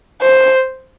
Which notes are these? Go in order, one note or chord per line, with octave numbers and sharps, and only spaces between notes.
C5